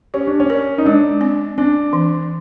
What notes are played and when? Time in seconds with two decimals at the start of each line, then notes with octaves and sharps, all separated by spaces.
0.14 C#4 G4
0.27 D4
0.40 C#4
0.50 A#4
0.78 D#4
0.86 G#3 D4
1.21 C4
1.58 C4 D4
1.93 E3